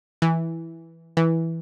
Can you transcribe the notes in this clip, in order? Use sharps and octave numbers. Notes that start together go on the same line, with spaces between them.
E3
E3